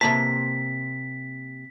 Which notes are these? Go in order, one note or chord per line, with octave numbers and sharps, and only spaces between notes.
C3 A#3 A5 B6